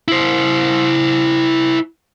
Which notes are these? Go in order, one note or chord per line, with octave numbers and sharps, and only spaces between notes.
E4 C5